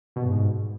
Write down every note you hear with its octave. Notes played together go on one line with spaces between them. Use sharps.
B2
G2
G#2